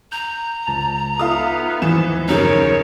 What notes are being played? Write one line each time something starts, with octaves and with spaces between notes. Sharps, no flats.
A#5 G6
C#2 A5
B3 D#4 F4 A4 E5 D#6
D#2 G#2 E3 F3 E7
F#2 C#3 D#4 A#4 C#5